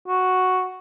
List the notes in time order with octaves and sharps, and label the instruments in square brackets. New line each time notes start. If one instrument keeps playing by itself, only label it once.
[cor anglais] F#4